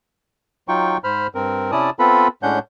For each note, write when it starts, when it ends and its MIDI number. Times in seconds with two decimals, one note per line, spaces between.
0.68 0.97 54
0.68 0.97 63
0.68 0.97 65
0.68 0.97 79
0.68 0.97 85
1.04 1.27 44
1.04 1.27 72
1.04 1.27 83
1.04 1.27 89
1.35 1.71 43
1.35 1.71 60
1.35 1.71 70
1.72 1.90 48
1.72 1.90 61
1.72 1.90 64
1.72 1.90 74
1.72 1.90 81
1.72 1.90 87
1.99 2.28 59
1.99 2.28 60
1.99 2.28 65
1.99 2.28 69
1.99 2.28 71
1.99 2.28 83
2.43 2.59 45
2.43 2.59 56
2.43 2.59 61
2.43 2.59 62
2.43 2.59 78
2.43 2.59 91